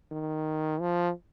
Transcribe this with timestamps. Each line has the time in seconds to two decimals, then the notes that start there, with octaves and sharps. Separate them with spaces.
0.11 D#3
0.81 F3